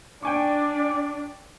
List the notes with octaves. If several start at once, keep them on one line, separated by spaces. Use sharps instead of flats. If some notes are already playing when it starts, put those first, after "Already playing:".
D4 D5 G5 G#5 C#6 D6